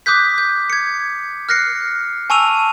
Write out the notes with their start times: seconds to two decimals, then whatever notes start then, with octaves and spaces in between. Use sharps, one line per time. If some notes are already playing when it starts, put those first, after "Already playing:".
0.06 D6 D#6 F#6 G6 B6
0.38 G6
0.70 G#6 C#7
1.49 F6 F#6 A#6 C7 C#7
2.30 G#5 A5 C#6 E6 D#7 F7